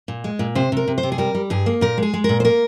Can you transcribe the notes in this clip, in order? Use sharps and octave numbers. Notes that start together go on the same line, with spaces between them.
A#2
G#3
A#2
C3 C5
C3 A#4
C3
C5
C3
G#4
G3 A#4
G3
G2 G#4
A#3
A#2 A#4
G#3
G#4
G#3
A#2 A#4
C5
A#3 A#4